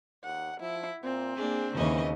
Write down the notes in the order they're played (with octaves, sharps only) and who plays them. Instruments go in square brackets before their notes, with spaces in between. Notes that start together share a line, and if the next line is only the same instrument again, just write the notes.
[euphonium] D#2 [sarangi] F#5
[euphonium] F3 [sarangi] E4
[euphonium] A#2 [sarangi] C4
[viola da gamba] A#3 D4 [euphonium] G#4
[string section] D#2 [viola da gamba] C#3 C#4 D#5 [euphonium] E3